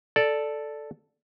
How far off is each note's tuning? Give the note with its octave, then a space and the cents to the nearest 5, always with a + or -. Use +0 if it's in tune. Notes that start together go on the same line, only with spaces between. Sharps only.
A4 +0 D5 +0